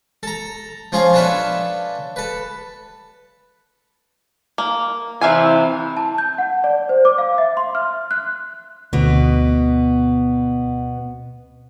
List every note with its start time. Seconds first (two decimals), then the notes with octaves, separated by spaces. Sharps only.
0.23 A4 A#5
0.92 F3 C#4 F4 G#4 F5
1.14 D4 F4 A4 B4 C#5 E5
2.16 A4 B4
4.58 A#3
5.21 C3 E3 E5 F5 G#5
5.97 A5
6.18 G6
6.38 F#5
6.64 D5
6.89 C5
7.05 D6
7.18 F5
7.38 E5
7.57 C6
7.75 F6
8.11 F#6
8.93 D2 B2 B3